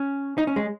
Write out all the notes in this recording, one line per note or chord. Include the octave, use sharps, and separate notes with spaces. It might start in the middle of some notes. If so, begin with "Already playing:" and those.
Already playing: C#4
D#4
C#4
G#3